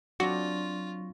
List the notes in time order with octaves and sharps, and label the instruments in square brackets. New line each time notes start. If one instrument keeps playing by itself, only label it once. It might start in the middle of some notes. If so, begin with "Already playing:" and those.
[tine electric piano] F#3 C#6 A#6 [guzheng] C4 D4 [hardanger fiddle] F4 [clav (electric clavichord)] F#4